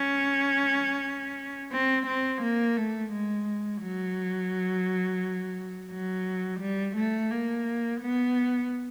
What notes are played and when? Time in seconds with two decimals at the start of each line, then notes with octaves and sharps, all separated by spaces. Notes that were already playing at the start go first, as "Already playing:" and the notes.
Already playing: C#4
1.72 C4
2.07 C4
2.42 A#3
2.77 A3
3.12 G#3
3.81 F#3
5.91 F#3
6.61 G3
6.96 A3
7.30 A#3
8.01 B3